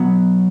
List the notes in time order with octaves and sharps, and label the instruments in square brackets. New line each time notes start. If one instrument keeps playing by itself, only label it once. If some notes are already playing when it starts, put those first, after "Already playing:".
Already playing: [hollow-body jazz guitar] B2 F#3 B3